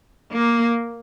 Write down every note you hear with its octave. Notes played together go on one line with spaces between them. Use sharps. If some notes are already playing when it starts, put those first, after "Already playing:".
A#3